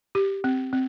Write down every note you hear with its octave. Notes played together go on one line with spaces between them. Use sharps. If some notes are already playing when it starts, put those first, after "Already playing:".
G4
C4
C4